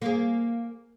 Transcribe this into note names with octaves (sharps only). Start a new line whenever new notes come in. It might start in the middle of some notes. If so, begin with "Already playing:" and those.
A#3 G#4